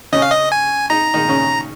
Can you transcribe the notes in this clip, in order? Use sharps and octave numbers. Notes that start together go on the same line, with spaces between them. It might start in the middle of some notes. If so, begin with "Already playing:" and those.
C#3 C#4 D#5
F5
D#5
G#5
D#4 A#5
D#3 D#4
C#3 C#4